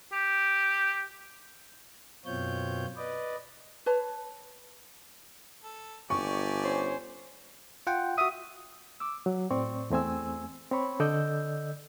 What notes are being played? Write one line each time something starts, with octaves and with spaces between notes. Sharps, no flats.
G4
F#2 B2 C4 F4 C#5 G6
B4 D5 D#5
B4 C#5 A5
A4
G1 G4 D5 G#5 C#6
C#4 C5 C#5
F4 F#5 G5
F#4 E5 D#6
D6 E6
F#3
A2 C4 D5 C#6
E2 A3 C4 G#5 E6
C4 C#5 B5 C#6
D3 A4 D5 D#5 E6 G6